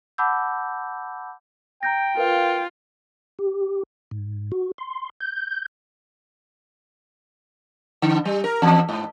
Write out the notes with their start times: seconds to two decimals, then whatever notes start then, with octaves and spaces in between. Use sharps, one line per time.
0.18 F#5 A5 B5 D6 E6 G6
1.83 G5 A#5 G6 A#6
2.17 F4 A#4 B4 F5
3.39 G4
4.11 G#2
4.52 F#4
4.78 C6
5.21 G6
8.02 D3
8.25 G3
8.44 A#4
8.62 E2
8.89 G#2